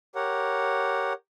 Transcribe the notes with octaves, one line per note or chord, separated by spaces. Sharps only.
G4 A#4 C#5 F#5